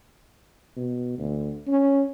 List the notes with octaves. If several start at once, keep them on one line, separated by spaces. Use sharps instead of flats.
B2
D2
C#4